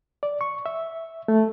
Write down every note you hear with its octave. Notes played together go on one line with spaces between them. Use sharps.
D5
C#6
E5
A3